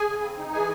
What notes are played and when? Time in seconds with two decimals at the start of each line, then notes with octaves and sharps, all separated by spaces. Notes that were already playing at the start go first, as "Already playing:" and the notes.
Already playing: G#4 G#5
0.08 C#3
0.24 C4
0.38 D#4
0.53 E3 G#4 G#5